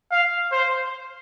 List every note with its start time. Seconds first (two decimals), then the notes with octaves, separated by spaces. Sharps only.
0.11 F5
0.52 C5